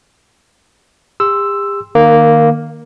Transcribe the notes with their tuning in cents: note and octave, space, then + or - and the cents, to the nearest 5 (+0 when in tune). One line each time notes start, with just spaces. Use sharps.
G4 +40 C6 +0 E6 +5
D#3 -25 A#3 +0